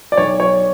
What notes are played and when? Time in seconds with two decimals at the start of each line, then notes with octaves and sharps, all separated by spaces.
0.12 D5
0.17 B1 C#5
0.40 C#5